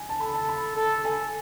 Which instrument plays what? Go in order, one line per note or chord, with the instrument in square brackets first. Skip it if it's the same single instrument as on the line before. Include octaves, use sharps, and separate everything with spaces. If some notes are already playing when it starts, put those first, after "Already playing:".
Already playing: [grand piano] G#5
A5
[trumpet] A4 [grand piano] B5
[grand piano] A5
B5
[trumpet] A4 [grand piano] A5
[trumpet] A4 [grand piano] G#5